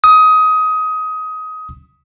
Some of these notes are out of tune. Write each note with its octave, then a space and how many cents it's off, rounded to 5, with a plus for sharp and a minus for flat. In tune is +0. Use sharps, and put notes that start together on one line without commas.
D#6 +20